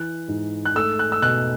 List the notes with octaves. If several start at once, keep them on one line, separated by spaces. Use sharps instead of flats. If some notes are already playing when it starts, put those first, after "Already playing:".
Already playing: E3 F#6
G#2
F#6
A3 E6
F#6
E6
B2 F#6